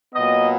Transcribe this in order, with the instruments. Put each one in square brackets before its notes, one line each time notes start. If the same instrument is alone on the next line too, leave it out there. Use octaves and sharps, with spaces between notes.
[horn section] A#2 F#3 B3 D#5